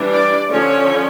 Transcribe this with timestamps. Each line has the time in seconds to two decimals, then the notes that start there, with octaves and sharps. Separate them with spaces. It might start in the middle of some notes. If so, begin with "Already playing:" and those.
Already playing: E3 G3 D4
0.10 D5
0.51 D3 F3 C#4 C#5